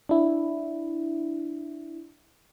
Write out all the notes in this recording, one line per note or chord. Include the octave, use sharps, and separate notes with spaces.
D4 E4